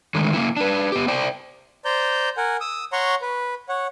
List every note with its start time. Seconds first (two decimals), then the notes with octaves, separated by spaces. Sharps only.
0.15 D3 D#3 G#3 A3
0.33 A#3 C#4 E4
0.57 D4 B4
0.92 B3 G4
1.08 C5 D5 G5
1.85 C5 D5 A#5 G6
2.37 A#4 F#5 G#5
2.61 D#6 E6
2.93 C#5 F#5 A#5 C6 C#6
3.22 B4
3.69 C#5 F#5